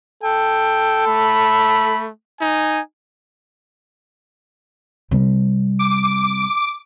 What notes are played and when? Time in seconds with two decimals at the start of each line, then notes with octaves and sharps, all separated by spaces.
0.23 A4 G5
1.07 A3 B5
2.41 D#4 G#5
5.11 C3 G3
5.79 D6